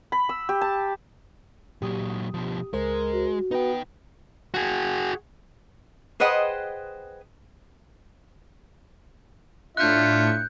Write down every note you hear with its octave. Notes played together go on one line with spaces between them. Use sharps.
B5
E6
G4
A5
A#2 F#3 G4 D#6
B2 F3
C#2 G#3 A#4 C5
F#4
B3 D#4 B4 G5
F#4 G#4
G#4 B4 C5 D#5 F#5 G5
A2 D4 F4 E5 F#6 G6 C#7